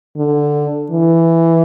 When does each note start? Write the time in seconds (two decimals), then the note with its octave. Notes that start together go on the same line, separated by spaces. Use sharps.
0.17 D3
0.91 E3